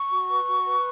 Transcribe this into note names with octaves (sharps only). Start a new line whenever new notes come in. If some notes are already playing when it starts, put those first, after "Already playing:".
Already playing: C#6
F#4
B4
F#4
B4